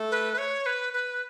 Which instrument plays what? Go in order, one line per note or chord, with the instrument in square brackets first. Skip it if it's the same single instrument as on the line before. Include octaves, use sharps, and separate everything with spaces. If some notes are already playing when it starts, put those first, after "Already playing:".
Already playing: [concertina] A3 A4
[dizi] B4
B4
C#5
B4
B4